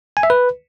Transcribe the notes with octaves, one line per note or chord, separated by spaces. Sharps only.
G#5
E5
B4